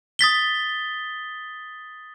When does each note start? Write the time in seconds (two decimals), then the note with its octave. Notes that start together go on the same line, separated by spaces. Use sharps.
0.19 D#6 A6 B6 G7